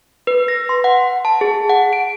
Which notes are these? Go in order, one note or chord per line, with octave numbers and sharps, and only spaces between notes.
B4
A#6
C6
F#5
A5
G#4
F#5
D7